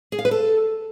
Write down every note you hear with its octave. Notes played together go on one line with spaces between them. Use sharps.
G#4
F5
B4
A4